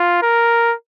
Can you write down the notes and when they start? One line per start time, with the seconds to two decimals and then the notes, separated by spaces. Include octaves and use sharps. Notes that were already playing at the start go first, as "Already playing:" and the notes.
Already playing: F4
0.23 A#4